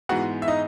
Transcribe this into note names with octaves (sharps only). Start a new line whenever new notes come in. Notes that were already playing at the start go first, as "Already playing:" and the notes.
G#2 E3 G#3 B3 F#4 F#5
E5
D#4 D#5